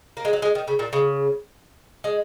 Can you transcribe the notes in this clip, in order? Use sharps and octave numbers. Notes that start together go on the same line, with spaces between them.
A#3
G#3
F#3
G#3
D#3
C#3
A#2
C#3
G#3